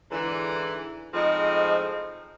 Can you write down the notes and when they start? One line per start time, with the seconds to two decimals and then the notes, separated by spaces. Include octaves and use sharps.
0.11 G#2 D3 E3
1.14 A2 F3 G#3 C4 D#4